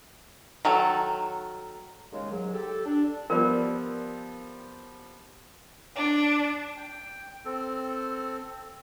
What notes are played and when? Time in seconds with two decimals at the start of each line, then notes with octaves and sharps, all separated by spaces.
0.65 D#3 F#3 A4
2.12 D#2 C#3 G#3
2.31 G#2 F#3
2.53 G4 A4
2.85 D4
3.30 F3 G3 B3 A#4 D5
5.96 D4
6.77 G5
7.45 C4 A4